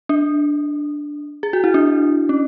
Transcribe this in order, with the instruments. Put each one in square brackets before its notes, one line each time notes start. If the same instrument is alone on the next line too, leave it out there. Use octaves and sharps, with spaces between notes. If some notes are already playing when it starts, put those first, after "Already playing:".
[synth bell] D4
G#4
F#4
E4
D4
C#4